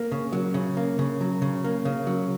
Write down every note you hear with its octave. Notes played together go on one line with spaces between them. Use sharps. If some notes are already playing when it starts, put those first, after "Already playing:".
Already playing: A#3
C#3
F#3
C#3
A#3
C#3
F#3
C#3
A#3
C#3
F#3